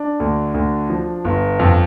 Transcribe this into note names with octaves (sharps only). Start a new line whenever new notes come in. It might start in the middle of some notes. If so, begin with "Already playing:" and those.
Already playing: D4
D2
D2
F3
G1
F2